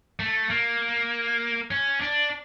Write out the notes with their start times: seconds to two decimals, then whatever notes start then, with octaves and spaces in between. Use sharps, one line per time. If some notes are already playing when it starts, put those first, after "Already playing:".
0.19 A3
0.50 A#3
1.71 C#4
2.01 D4